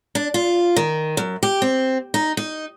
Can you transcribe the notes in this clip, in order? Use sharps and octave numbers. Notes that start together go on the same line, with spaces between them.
D4
F4
D#3
F#2
G4
C4
D#4
D#4